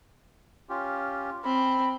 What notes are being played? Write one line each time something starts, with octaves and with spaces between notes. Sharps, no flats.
C#4 F4 G4
C4 B5